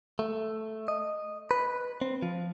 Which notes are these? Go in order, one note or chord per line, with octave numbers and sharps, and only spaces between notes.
A3
D#5
B4
C4
F3